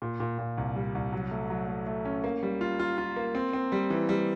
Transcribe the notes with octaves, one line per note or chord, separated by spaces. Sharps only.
A#2
A#2
A#2
C2
G3
C2
F#3
A3
F#3
A3
A3
C#4
A#3
G3
F4
F4
F4
A#3
C4
C4
G3
E3
G3